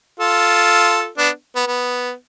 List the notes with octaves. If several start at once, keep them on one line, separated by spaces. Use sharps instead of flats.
F4 A4
B3 D4
B3
B3